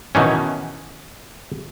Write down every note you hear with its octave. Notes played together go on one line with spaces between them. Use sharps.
B2 D#3 E3 C#4